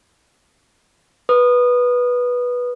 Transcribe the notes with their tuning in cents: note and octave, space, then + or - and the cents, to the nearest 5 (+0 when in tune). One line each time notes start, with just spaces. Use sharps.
B4 -10 D#6 -20